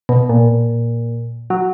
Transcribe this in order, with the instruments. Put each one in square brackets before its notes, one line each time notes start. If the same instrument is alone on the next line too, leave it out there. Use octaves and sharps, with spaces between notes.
[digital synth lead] B2
A#2
F#3